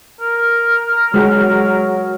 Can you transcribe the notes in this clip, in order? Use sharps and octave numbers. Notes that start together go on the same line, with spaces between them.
A#4
F#3 G#3 F#4